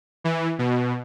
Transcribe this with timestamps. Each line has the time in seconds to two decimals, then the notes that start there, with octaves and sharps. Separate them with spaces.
0.24 E3
0.59 B2